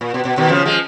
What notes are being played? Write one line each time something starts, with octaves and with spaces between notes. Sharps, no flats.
A#2
B2
B2
B2 D#3
C#3 F3
F3 G#3